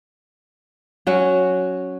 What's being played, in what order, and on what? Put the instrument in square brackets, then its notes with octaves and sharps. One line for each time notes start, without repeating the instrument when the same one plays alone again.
[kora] F#3 C#4 F#4